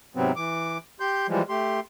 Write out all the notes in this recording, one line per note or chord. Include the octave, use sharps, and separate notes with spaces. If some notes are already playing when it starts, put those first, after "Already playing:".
G#2 C3 F#3 B3 C4
E3 D6
G4 C6 G6
E3 F3 G3 G#3
A3 G4 C6